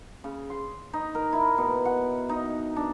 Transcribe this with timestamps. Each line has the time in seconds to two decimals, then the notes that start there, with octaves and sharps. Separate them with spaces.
0.24 C#3
0.50 C6
0.93 D#4
1.15 A#4
1.33 E4
1.58 B2
1.85 F#5
2.29 D#4
2.76 D4